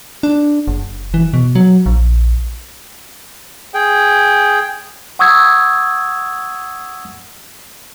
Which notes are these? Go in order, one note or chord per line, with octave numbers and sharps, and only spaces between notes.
D4
F#1
E3
B2
F#3
A#1
G#4 G5
F#5 C#6 D#6 E6 G#6